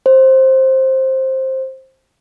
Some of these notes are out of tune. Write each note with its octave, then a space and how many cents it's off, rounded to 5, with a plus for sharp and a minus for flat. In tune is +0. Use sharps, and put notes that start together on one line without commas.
C5 +10